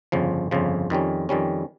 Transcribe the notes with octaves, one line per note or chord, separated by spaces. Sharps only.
G1 F2 C#3 F3
G1 F2 C#3 F3
F2 D#3 G3 C#4
F2 D#3 G3 C#4